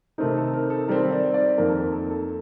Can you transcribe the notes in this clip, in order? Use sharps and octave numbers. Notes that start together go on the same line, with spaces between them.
C3 D#3 A3 C4 D#4 A#4
A4
A#4
A4
D#3 G3 C4 A#4
D5
D5
F2 D#3 A#3 A#4
A4
A#4
A4
A4